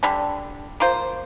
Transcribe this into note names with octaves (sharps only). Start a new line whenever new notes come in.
D3 G3 D4
A#3 F4 C5